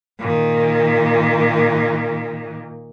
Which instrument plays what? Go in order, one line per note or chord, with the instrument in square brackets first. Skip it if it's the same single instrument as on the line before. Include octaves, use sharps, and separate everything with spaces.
[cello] A#2 D#3